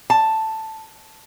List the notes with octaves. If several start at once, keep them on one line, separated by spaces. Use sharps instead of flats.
A5